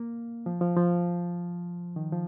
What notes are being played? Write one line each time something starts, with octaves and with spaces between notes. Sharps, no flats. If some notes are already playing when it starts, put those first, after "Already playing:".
Already playing: A#3
F3
F3
F3
D#3
F3